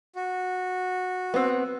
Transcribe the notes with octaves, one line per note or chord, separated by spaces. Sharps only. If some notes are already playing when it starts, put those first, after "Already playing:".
F#4
B3 C4